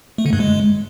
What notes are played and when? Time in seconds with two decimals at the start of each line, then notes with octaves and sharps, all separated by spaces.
0.18 A3
0.26 D3
0.33 G2
0.40 G#3